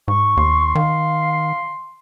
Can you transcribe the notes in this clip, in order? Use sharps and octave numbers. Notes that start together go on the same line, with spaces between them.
G#2 C#6
D#2 C6
D#3 F5